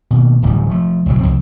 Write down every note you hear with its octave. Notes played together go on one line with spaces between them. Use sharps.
B2 D#3 A#3
D1 A1 F#2 G3
F3 A3
F#1 B1 F#3 G3
C2 F2 F3 C4